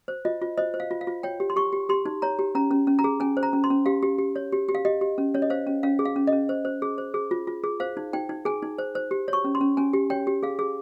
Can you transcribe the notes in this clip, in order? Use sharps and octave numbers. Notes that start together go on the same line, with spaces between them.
C5
F4 D#5
F4
C5 D#5
C5
F5
F4
F5
F4
C#5 G5
G4
C6
G4 C#6
G4
G4 C6
D#4
C#5 A#5
G4
C#4 A#5
C#4
C#4
A#5
G#4
C#4 G#5
C5
A#5
C#4
C6
C#4
G4 F5
G4
G4
C#5
G4
G4
F5
G4 D#5
G4
C#4
C#4 C#5
D#5
C5 F5
C#4
C#4 F5
G#4
F5
C#4
D#5
C#4
C5
C5
G#4
C5
G#4
F4
F4
G#4
C5 F5
D#4
D#4 G5
D#4
G#4 G#5
D#4
C5
C5
G4
C#5
C#6
C#4
C6
C#4
C#4 G#5
G4
C#5 G5
G4
G#4 F5
G#4